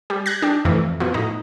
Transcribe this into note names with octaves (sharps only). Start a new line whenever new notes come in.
G3
F#6 G#6 A#6
D4 G4
F2 A2 E3
B2 F3
A2 D#4